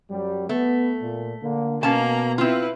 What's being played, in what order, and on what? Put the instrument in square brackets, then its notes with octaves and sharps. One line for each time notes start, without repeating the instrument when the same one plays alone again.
[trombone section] F#2 F#3 G3
[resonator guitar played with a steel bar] A3 [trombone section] B3
[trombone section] A#2
D3 A#3
[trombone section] B2 [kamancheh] A#3 A#5 [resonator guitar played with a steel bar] C#4 A5
[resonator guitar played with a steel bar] C4 F4 [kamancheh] E4 B4